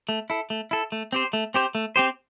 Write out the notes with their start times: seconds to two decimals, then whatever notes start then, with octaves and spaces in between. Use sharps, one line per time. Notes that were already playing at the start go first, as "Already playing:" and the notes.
0.09 A3
0.30 E4 A4
0.50 A3
0.71 E4 A4
0.92 A3
1.12 C4 G4 C5
1.33 A3
1.54 C4 G4 C5
1.75 A3
1.96 C4 G4 C5